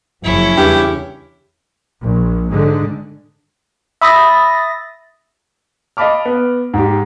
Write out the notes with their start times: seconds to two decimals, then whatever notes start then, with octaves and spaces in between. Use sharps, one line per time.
0.23 F#1 F3 C#4 E4
0.58 E2 G2 C#3 G4
2.01 A#1
2.50 G#2 D3
4.01 E5 B5 D#6 A6 A#6
5.97 D#5 F5 A5 B5 D6 F6
6.25 B3
6.74 G#2 G4